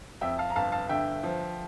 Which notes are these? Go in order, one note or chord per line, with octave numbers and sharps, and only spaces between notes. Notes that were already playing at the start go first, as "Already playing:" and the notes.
F2 E5 G5
F5 A5
A#5
G1 F5 A5
F5 A5
D3 E5 G5
F3